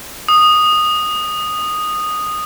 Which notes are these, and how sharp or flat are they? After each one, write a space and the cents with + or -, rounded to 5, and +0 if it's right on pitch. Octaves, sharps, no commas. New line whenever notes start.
D#6 -10